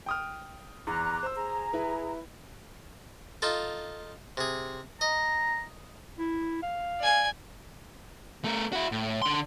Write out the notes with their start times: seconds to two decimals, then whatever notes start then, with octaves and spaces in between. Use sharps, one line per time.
0.06 G5 D#6 F6
0.87 E2 A#5 D6 F#6
1.23 C5 E6
1.35 G#4 A#5
1.73 E4 B4
3.42 D#4 F4 A4
4.37 C3 G#4
5.01 D#5 A#5
6.19 E4
6.63 F5
7.00 D5 G#5
8.44 A3 A#4
8.73 E4 F#4
8.92 A2
9.22 D3 C6